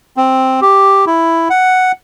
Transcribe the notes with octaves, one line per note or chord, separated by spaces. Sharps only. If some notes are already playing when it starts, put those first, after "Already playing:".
C4
G4
E4
F#5